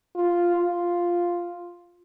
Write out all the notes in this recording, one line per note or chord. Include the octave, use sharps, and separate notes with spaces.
F4
F4